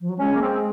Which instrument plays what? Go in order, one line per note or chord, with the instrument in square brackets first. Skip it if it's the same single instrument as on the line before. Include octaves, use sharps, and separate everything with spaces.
[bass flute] F3
F#3
[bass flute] G#3 [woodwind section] C#4
[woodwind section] A#3
C4